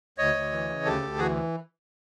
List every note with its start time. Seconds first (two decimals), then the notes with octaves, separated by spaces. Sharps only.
0.18 D2 C#5 D#5
0.35 D2
0.52 E3
0.69 C#3
0.85 D2 G4 A4
1.02 D2
1.18 E3 F#4 G#4